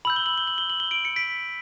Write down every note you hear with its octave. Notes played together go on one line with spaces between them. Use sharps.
B5 E6 G6 F#7
G7
F#7
G7
F#7
G7
F#7
G7
D7 F#7
C#7
B6 D7